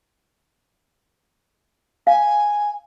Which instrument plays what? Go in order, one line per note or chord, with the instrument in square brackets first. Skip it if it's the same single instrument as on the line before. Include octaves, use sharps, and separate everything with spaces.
[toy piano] F5 [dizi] G#5